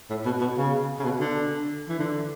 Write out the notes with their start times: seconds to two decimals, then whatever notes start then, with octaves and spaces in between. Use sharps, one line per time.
0.10 A2
0.25 B2
0.41 B2
0.57 C#3
0.99 C#3
1.04 B2
1.20 D3
1.88 E3
1.99 D3